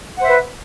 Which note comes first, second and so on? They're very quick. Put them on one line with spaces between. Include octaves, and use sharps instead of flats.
F#5 C5 E5 B4